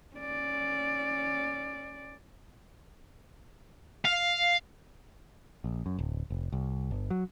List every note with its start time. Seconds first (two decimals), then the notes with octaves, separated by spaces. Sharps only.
0.16 C#4 D5
4.05 F5
5.64 A#1
5.86 F#2
5.99 D1
6.30 F1
6.52 C2
6.91 G1
7.10 F#3